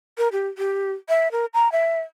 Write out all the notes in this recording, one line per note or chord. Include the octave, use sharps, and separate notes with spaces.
A#4
G4
G4
E5
A#4
A#5
E5